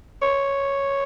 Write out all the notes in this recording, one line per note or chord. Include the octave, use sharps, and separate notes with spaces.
C#5